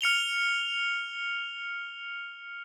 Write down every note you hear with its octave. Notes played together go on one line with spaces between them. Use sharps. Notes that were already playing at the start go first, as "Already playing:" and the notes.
F6 C#7 F7 G7